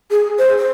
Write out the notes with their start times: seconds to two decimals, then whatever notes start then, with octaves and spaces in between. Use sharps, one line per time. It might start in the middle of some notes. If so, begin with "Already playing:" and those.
0.11 G#4
0.39 C5
0.58 C5